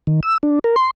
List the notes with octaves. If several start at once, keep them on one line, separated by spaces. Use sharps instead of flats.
D#3
E6
D4
A#4
C6